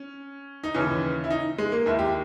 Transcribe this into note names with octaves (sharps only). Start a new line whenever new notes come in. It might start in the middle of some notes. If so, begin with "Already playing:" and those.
Already playing: C#4
D#4
D#2 C#3 E3 C#4
E4
D#4
G#3
A#3
D#2 D#3 E4
G4